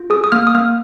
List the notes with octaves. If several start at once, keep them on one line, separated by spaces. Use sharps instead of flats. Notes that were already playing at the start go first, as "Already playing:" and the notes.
Already playing: F4
G#4 D#6
D#6
A#3 F6
D#6
A#3 F6